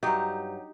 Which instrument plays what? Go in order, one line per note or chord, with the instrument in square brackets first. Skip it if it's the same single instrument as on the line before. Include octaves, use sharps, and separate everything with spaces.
[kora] G2 F#3 D#4 G4